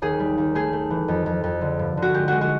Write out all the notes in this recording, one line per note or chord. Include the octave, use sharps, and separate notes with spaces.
D#2 G#4
G3
D#2
A3 G#4
A3
E3
F2
F2
F2
D3
G2
D3
F#4
G#3 G4
G#3 F#4
F#4